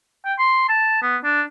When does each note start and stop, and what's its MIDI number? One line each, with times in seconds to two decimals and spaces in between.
0.25 0.33 79
0.39 0.64 84
0.69 0.99 81
1.02 1.16 59
1.24 1.42 62